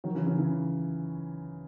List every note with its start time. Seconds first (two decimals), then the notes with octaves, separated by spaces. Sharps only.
0.04 D#3 F#3
0.15 C#3 E3
0.27 C#3 E3
0.38 C#3 E3